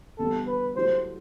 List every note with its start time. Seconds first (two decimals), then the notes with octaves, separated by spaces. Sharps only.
0.19 E2 D3 G3 B3 A4
0.47 B4
0.75 F#3 A3 E4 G4 C5